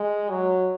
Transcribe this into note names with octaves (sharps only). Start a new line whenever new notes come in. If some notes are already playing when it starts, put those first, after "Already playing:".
Already playing: G#3
F#3